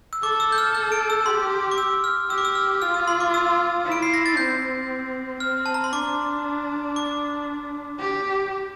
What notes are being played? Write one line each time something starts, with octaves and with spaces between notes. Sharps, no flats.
E6
A4 D6
E6
G6
F6
G6
D7
E6
G4 C6
D6
E6
F6
G4 E6
D6
E6
F6
F4 F6
E6
C6
D6
E6
E4
D7
C7
A#6
A6
C4 G6
C4 F6
A5
A#5
C6
D4 D6
D6
G4